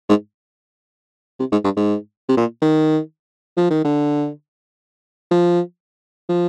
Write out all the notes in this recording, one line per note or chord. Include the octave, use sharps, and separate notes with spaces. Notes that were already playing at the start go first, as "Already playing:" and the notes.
G#2
C3
G#2
G2
G#2
C3
A#2
D#3
F3
D#3
D3
F3
F3